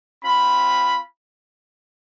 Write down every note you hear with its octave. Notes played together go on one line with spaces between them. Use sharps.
C4 F4 B5